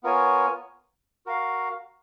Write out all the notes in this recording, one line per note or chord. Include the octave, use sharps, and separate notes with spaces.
B3 F4 A#4 C#5 G#5
F#4 A#4 F5